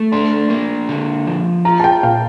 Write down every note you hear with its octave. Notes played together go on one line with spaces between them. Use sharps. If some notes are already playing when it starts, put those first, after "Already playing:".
Already playing: A3
D4 C6
A#3
D3
F3
F4 A#5
A5
G5
A#2 F5